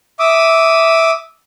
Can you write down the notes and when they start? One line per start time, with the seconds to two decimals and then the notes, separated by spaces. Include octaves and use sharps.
0.19 E5 D6 D#6